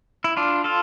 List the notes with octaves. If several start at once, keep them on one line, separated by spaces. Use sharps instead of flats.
E4
D4 F4
F4 A4